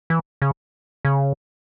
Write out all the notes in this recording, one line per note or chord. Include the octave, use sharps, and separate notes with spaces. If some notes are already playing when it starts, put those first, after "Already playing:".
E3
C#3
C#3